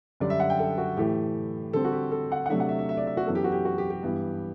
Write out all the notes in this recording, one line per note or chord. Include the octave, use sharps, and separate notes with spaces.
F#2 D3 G3 D4 D5
E5
F#5
G5
A4
F#4
A2 E3 A3 G4
D3 G3 C4 A4
F#4
G4
A4
F#5
F#5
C3 F#3 A3 D4 E5
F#5
E5
E5
E5
D5
E5
F#4
F#2 E3 B3 A4
G4
F#4
G4
F#4
G4
G4
G2 E3 B3